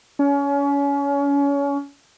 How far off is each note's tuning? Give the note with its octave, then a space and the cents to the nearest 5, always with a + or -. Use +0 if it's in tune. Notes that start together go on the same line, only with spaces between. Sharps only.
C#4 +30